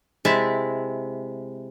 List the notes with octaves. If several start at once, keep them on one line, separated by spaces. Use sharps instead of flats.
C3 G#3 E4 E5 A5